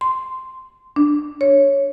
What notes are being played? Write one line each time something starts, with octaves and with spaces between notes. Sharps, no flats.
C6
D4
C#5